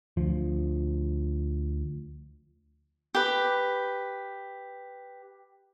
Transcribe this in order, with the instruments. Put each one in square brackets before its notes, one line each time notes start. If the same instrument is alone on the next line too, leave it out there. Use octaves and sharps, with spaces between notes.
[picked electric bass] D2 F3
[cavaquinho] G4 B4